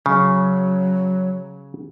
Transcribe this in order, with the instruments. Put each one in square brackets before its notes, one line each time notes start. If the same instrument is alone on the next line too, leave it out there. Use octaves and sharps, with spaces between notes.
[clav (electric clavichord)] C#3 [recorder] F#3